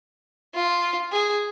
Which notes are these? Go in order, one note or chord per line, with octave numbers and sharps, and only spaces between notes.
F4
G#4